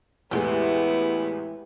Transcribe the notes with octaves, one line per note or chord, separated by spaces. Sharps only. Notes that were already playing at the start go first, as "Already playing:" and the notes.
E2 A2 E3 G#3 B3 E4 G4